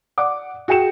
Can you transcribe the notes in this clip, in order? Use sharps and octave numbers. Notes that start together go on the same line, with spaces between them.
D5 F#5 D6
F#4 G#4 G5 C#7 E7